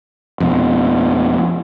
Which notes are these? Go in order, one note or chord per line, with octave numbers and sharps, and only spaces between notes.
F2 B2